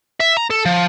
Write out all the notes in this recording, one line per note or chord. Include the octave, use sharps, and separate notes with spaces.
E5
A#5
A4
F3